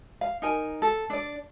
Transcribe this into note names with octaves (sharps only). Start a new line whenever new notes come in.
F5
D#4 A#4 G#5
A4
D4 D5